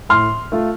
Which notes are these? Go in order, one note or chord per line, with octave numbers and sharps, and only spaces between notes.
A2 C6 F6
A3 F4